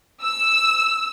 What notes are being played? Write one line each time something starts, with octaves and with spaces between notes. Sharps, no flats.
E6